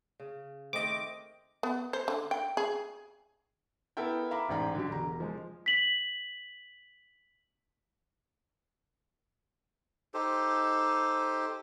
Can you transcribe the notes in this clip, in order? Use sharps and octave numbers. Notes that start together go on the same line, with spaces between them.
C#3
D#3 A3 C4 D#5 D6
B3
C5
D3
G5
G#4
B3 E4 A4 A#4 G5
E5 F5 A#5 B5 D6
A1 G#2 D5 G5 A#5
D3 F#3 G4
E1 A#5
F3 G#3
B6 F#7
D#4 G4 A4 C5